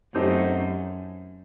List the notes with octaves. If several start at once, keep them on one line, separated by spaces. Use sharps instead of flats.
F#2 A3 C4 D#4 G4